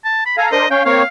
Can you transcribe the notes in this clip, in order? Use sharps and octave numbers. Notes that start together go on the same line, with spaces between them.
A5
B5
A4 F5 G#5 A#5
D4 A#4 C5 D#5
C#4 C#5 F5 G5
A#3 C4 C#5 F5